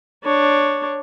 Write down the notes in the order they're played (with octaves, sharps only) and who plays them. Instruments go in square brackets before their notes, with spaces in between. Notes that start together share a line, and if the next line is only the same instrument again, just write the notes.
[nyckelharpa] D4 C#5